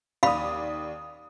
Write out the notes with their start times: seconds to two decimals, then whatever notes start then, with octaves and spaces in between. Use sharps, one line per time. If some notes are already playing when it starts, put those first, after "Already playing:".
0.23 D#2 D5 F5 B5 D#6